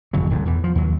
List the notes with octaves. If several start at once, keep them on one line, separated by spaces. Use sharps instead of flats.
G1 F2 C#3 F#3
D1 G#2
E2 E3
F3
D#2 F#3